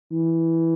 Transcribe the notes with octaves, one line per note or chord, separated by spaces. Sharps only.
E3